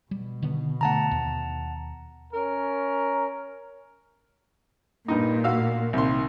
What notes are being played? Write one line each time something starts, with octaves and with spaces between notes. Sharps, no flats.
B2 G3
D3 D#3 B3
D3 A3 F#5 A5 A#5
D#2
C#4 A#4
G2 A#2 D#4
F#4 F5 E6
C2 D#3 C6